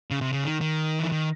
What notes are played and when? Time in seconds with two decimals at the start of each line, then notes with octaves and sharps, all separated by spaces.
0.11 C#3
0.21 C3
0.33 C#3
0.44 D#3
0.61 D#3
0.99 E3
1.12 D#3